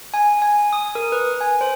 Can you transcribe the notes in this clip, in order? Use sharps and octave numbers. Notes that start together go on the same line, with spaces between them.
G#5
G#5
D#6
A#4
B4
G#5
C5